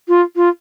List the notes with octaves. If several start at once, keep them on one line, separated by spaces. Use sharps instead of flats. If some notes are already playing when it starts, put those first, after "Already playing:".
F4
F4